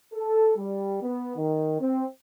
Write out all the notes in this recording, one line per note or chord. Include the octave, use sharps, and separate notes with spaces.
A4
G3
B3
D#3
C4